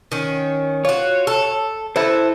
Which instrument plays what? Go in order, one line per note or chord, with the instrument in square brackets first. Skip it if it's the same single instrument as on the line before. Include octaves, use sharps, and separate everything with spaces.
[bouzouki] D#3 C#4
[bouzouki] F4 F#4 [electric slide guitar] C#5
[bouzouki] A4
[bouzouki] E4 A4 B4 [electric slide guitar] C5 E5